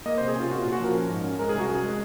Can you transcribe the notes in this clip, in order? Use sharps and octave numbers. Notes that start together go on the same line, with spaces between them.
A#3 D#5
C5
C3
G#4
C#4 F4
A#2 F#4
F4
A#2
F#4
F3 A#4
C#4
G#2
C#4
G#3 A#4
G#4
C2
F#4
C#4 G#4
G#3